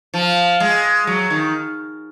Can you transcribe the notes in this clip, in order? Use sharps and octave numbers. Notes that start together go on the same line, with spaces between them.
F3
G#3
F#3
D#3